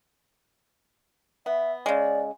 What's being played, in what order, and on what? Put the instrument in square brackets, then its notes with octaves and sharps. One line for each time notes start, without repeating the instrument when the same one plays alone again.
[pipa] B3 [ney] E5
[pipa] C#3 G#3 [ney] D5